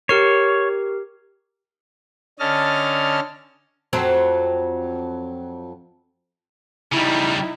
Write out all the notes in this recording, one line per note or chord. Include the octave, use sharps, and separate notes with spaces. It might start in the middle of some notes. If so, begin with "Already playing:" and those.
G4 A#4 C#5 C7
D3 C#4 D#5 A5 F6
F2 F#3 C4
C#3 G3 D#4 E4